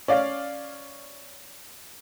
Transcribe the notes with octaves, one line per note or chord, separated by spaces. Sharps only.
C#4 D5 F5